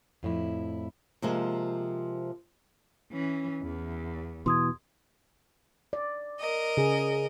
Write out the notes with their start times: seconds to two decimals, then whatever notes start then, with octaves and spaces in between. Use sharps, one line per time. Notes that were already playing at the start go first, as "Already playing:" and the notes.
0.23 F2 A2 E4
1.22 C3 F3 G#3 A#3
3.12 E3 C#4
3.62 E2
4.46 B2 E3 C6 D#6 G#6
5.93 D5
6.39 A#4 D#5
6.77 C#3 G#4